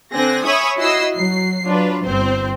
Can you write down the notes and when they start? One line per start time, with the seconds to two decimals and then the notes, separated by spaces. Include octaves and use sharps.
0.14 D3 C4 G#5 F#6 A#6
0.44 C#5 E5 G#5 B5 C#6 D#6
0.78 E4 F#4 D#5 E6 C7
1.16 F#3 C7
1.66 F#3 D4 F4 B4
2.04 G1 C4 C5